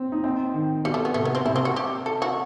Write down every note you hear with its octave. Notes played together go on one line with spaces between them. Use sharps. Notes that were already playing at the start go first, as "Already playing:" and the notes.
Already playing: C4
D#4
C4
D#3
B2 G3
A3
B3
C3 A3
B3
C4
C3 E4
C4
F#4
G4
A4
F#4